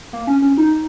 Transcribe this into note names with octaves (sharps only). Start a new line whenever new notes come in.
A#3
C#4
C#4
D#4